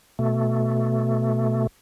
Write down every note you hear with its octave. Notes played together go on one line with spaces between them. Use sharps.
B2 A3